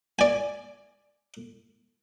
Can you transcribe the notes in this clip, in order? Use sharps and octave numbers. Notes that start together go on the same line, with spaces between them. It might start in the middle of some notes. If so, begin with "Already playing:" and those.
D5 G#5